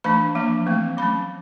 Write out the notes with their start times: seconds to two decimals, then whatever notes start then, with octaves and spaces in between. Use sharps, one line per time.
0.04 E3 A3 D4 B5
0.35 F3 A#3 D4
0.67 E3 A3 C4
0.97 F#3 A3 C#4 B5